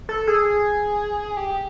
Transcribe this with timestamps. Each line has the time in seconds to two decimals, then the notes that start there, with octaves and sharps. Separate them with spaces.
0.09 A4
0.27 G#4
1.37 G4